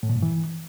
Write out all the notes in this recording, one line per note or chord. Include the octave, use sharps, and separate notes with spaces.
A2
A#2
G2
E3